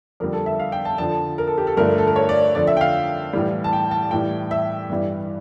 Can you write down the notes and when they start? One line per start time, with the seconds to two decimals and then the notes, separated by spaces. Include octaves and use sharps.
0.20 F2 D3 G3 A#4
0.33 A4
0.46 E5
0.59 F5
0.72 G5
0.85 A5
0.98 F2 D3 F3 A5
1.38 A#4
1.48 A4
1.58 G4
1.67 A4
1.77 G2 D3 F3 A3 A#4
1.98 A4
2.07 A#4
2.16 C#5
2.29 D5
2.55 F2 D3 F3 D5
2.67 E5
2.77 G5
2.81 F5
3.33 A2 E3 G3
3.64 A5
3.73 G5
3.91 A5
4.11 A2 E3 G3 G5
4.51 E5
4.90 G2 E3 G3